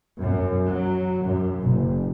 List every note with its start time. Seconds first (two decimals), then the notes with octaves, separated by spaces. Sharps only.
0.20 F#2
0.64 F#3
1.24 F#2
1.63 F#1